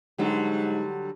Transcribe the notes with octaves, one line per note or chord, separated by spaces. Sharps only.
G#2 D3 F#3 G3